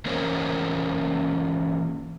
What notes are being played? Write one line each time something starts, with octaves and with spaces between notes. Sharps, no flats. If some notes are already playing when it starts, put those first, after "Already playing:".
E3 A#3 C#4 A#4 C5 C#5